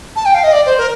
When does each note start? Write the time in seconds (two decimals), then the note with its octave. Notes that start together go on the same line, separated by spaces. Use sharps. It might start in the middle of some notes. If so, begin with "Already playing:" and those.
0.16 A5
0.25 G5
0.34 F5
0.44 D#5
0.52 D5
0.66 C5
0.78 A#4